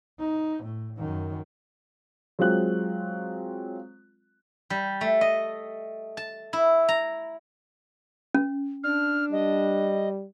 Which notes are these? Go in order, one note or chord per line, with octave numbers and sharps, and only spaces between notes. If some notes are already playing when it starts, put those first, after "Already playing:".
D#4
A2
F#2 D#3
F#3 G#3 C4 F4 F#6
G3
A3
D#5
A5
E4
A#5
C#4
D4 F6
G3 D#5